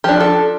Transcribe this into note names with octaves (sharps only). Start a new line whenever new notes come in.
F3 D4 G4
A4